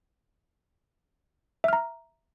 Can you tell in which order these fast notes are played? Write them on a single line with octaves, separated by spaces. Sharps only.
E5 F6 A#5